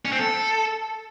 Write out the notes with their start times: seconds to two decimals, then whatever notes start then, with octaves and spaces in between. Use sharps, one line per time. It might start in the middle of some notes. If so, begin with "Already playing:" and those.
0.05 C#4
0.12 C4
0.19 A4